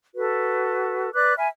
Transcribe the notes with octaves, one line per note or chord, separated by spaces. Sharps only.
F#4 A4 B4
B4 D5 D6 F#6
E5 G#5 B5 F6